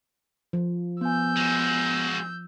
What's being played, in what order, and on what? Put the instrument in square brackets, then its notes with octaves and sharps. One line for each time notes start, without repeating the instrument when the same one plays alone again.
[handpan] F3
[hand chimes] B3 G#5 [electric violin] E6 G6
[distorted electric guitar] G#3 F#4